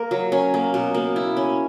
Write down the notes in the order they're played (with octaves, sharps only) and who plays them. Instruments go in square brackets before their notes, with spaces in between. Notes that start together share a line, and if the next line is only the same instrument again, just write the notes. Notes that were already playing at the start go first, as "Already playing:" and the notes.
Already playing: [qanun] A#3 A#4
F#3
C#4
A#3
B2
A#3
E4
C#4